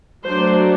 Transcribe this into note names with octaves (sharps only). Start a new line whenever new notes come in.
F#3 A3 D4 C5